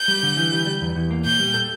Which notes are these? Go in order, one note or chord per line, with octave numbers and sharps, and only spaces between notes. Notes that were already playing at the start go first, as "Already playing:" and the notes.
Already playing: G6
G3
D3
E3
G3
G3
E2
E2
A#3
A#2 G6
G3
A4